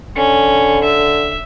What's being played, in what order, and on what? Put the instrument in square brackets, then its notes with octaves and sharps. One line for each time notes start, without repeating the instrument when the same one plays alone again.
[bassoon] D3 [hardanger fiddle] C#4
[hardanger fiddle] E5